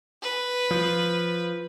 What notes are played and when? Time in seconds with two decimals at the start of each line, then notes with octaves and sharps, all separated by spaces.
0.23 B4
0.71 F3